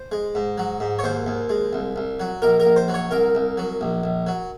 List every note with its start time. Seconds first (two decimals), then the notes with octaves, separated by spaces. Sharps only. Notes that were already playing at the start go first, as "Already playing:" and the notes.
Already playing: C5
0.12 G#3
0.35 G#2
0.58 F#3
0.80 G#2
0.99 C#5
1.04 D#2 C5
1.26 D#2
1.49 G#3
1.73 C2
1.96 C2
2.20 F#3
2.42 A#1 A#4
2.60 A#4
2.65 A#1
2.76 C5
2.88 F#3
2.94 C#5
3.11 C2 A#4
3.35 C2
3.57 F#3
3.81 A#1
4.04 A#1
4.27 F#3